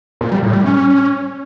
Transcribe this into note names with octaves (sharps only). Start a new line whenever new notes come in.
A#2
G3
A2
G3
C#4